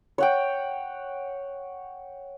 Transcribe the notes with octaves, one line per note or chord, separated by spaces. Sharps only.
C#5 F#5 G5